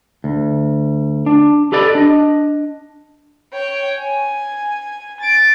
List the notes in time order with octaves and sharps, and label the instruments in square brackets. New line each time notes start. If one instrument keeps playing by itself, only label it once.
[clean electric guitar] D2
D4
G4 A4 B4 D5 D#5
D4 D#5
[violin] C#5 G5
G#5
A6 D7